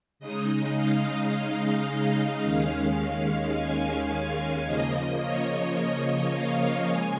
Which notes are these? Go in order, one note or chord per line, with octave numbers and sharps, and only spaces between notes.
C#3 G#3 D#4 D#5
F5
D#5
F5
D#2 D#3 G#3 C#4
G#5
F5
C#3 F3 A#3 D#5
C#5
D#5
F5
C#3 G#3 G#5